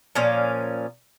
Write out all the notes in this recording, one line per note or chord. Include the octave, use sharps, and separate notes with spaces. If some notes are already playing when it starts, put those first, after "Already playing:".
A#2 F3 C#4 F5